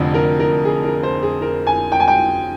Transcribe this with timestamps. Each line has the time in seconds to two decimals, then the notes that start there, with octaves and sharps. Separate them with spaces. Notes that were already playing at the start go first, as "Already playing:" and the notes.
Already playing: F1 F2 D3
0.14 A#4
0.40 A#4
0.65 G#4
0.85 A#4
1.03 C5
1.23 G#4
1.42 A#4
1.67 G#5
1.92 G5
2.00 G#5
2.08 G5